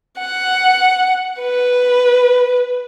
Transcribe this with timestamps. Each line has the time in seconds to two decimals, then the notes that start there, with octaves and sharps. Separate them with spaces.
0.18 F#5
1.40 B4